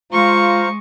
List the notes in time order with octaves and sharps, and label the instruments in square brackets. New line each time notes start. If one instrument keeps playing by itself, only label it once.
[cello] G#3 [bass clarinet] F4 [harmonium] C5 F5 A#5 [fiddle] C#6